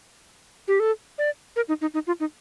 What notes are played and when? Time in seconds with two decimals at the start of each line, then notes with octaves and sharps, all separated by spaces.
0.68 G4
0.80 A4
1.18 D5
1.56 A#4
1.68 D#4
1.81 D#4
1.94 D#4
2.07 F4
2.20 D#4